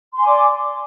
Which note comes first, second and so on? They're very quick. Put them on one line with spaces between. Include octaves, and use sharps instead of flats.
C6 G#5 D6 D5